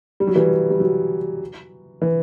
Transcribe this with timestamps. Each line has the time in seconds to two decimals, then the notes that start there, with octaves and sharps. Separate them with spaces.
0.20 G3
0.27 F#3
0.35 E3 G3
0.70 G3
0.80 F#3
2.02 E3